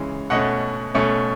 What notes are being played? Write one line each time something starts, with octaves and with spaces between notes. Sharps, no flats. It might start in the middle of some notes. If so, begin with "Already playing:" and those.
Already playing: C#3 E3 G#3 C#4
B2 A3 C#4 D#5 F#5
B2 A3 C#4